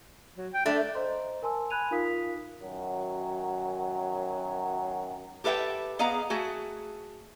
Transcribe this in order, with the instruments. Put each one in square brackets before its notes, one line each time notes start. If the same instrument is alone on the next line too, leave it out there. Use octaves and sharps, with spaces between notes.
[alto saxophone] F#3
G5
[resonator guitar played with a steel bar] A3 [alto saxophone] D4
[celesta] C5 D#5 A#5 C6
A#4 G#5 A5 C6 E6
G#5 B5 F#6 G#6 D#7 F7
D#4 F4 A#4 F5 D#6 B6
[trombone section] F#2 D#3 F#3
[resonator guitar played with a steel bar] G4 A4 B4 E5 G5
B3 G#4 D#5 F5 A#5
A3 F#4 G#4